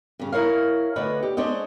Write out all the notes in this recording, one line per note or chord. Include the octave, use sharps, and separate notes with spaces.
G2 C#3
E4 A#4 C#5 F5
D2 D3 D4 B4 C#5 D#5
G4
G#3 D4 C5 C#5 D#5